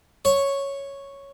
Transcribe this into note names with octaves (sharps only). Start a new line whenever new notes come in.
C#5